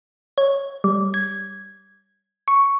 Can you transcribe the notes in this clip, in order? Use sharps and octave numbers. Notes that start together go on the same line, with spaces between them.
C#5
G3
G#6
C#6